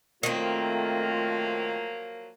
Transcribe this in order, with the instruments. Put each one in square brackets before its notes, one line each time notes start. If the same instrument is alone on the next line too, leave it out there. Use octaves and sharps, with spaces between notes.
[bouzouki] D#3 C4 [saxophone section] F3 F#3 A#3 [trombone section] A3 F4